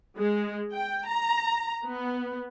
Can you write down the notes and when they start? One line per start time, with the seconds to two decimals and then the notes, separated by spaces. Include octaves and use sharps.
0.18 G#3
0.72 G5
1.08 A#5
1.86 B3